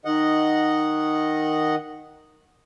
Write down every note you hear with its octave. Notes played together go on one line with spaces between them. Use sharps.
D#3 D#5 F#5